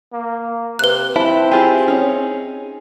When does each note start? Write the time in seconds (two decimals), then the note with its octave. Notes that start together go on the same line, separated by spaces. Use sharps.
0.13 A#3
0.79 C3 B4 F#6
1.16 C4 E4 A5
1.52 E4 F4 G4 G#4
1.88 C#4 D#4 C#5